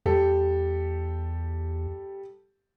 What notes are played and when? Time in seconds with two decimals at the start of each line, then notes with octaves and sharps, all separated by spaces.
0.06 E2 G3 G4 A4